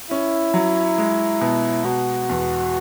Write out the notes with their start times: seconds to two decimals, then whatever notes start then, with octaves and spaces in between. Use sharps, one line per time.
0.11 C#4 E4
0.54 F#3
0.98 G#3
1.41 B2
1.84 B2 F#4
2.29 E2